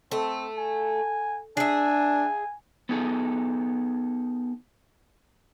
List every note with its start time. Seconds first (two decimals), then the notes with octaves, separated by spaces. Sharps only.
0.12 A3 C4
0.57 G#5
1.57 D4 G#4 E5 G#5
2.89 B3 D#4 G#4 A4